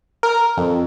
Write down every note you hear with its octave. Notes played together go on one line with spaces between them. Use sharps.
A#4
F2